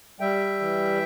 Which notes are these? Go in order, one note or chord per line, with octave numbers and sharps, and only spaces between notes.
G3 E5 G5
E3